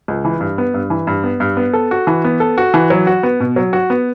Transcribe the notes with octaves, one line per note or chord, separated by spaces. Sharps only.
C#2
E3
G2
B3
G2
E3
G2
B3
G2
B3
A4
F#4
E3
B3
A4
F#4
E3
F#3
F#4
B3
B2
F#3
F#4
B3